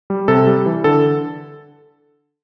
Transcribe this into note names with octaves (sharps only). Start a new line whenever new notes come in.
G3
C3 A4
G3
E3
D3 A4